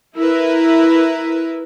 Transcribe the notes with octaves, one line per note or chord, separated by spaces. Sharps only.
E4 A#4 B4